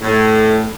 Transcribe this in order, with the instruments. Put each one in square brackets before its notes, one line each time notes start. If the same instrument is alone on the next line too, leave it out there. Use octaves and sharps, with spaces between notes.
[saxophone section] A2